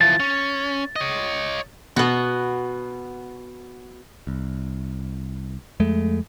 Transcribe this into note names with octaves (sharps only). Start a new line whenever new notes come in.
E3 F3 A6
C#4
C#5 D#5
B2 B3 F#4
C2
F2 G#3 A3